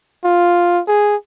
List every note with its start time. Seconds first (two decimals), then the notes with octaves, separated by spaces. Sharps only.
0.24 F4
0.88 G#4